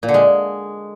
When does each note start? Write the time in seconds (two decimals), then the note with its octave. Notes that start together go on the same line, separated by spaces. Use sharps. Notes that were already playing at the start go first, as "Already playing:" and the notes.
0.03 A#2
0.08 D3
0.14 G#3